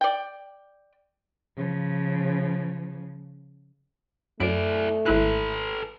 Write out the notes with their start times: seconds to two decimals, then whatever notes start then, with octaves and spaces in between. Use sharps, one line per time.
0.01 D5 G5
1.57 C#3 F3
4.40 F#2 A3 E4 D5 D7
5.06 G#1 E4 A4 B4 F#6